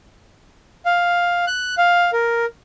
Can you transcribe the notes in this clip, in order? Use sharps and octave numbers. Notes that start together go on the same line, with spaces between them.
F5
F#6
F5
A#4